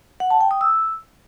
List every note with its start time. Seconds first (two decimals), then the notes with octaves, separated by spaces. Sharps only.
0.20 F#5
0.30 A5
0.41 G5
0.51 D#6
0.61 E6